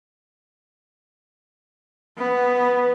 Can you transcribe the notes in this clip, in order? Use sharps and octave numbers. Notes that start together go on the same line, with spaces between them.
B3